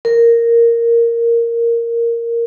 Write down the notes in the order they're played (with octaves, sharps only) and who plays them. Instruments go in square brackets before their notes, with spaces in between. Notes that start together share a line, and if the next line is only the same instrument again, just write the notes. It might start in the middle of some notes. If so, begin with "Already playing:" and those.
[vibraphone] A#4